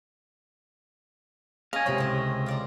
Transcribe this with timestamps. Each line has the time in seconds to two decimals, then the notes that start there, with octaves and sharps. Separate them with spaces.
1.73 C#4 D#5 F5 G#5
1.86 C#2 C3 A#4 C5 C#5 B5
1.98 A2 C4
2.46 F4 D5 A#5